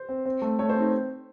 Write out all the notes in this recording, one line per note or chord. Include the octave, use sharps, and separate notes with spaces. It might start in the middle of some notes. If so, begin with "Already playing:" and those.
Already playing: C5
C4
C4
A3
A3 C#5
C5
C4
D#4